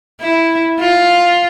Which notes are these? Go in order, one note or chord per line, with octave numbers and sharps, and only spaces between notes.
E4
F4